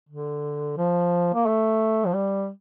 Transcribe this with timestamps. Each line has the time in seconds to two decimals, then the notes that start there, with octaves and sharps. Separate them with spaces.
0.09 D3
0.77 F3
1.34 A#3
1.46 A3
2.06 F3
2.14 G3